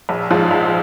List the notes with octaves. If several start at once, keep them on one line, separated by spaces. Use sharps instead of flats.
A#1
G#2 F3
A#1